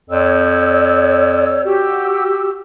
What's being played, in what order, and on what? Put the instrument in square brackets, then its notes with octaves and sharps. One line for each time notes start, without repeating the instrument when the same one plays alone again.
[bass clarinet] F2 [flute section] C#5 D5 E6
[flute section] F#4 G4 E6